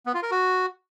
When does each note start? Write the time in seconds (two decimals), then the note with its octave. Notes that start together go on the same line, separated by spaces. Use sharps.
0.06 B3
0.14 F4
0.23 A#4
0.31 F#4